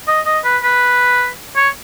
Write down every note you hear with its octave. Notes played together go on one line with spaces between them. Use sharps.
D#5
D#5
B4
B4
C#5